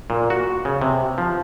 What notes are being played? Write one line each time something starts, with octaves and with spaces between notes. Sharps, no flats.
A#2
F#4
C#3
C3
F3